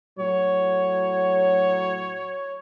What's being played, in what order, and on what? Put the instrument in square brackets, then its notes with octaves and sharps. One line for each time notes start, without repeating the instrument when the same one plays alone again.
[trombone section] A2 F#3 [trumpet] C#5